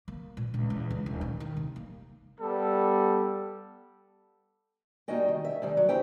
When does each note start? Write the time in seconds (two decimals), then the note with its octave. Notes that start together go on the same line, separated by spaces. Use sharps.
0.08 A#3
0.37 A#2
0.54 C#2
0.70 E2
0.90 C#2
1.06 D#1
1.21 D#3
1.40 D#3
1.57 C3
1.76 A#3
2.39 G3 B3 A4
5.08 G3 A#3 D#4 F#4 D#5 G5
5.28 D#3
5.45 E5
5.62 D2 D#3 G3
5.77 F#3
5.89 D#4 E4 G4 C5 G5